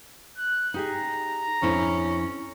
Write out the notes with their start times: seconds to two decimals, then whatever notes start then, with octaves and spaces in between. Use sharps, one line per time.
0.38 F#6
0.74 D#4 G4 G#4 A#5
1.62 F2 C#4 D4 E4